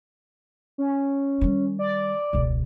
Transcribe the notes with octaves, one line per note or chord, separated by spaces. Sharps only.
C#4
D#3 G3
D5
E1 C#2